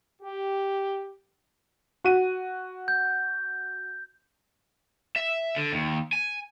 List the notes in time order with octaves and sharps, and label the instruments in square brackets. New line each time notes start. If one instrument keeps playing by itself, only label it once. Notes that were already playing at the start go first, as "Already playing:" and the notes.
[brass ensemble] G4
[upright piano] F#4 D#7
[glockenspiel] G6
[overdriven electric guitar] E5
D3
D#2
G#5